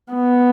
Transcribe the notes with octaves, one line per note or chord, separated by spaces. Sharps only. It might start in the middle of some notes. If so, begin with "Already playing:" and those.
B3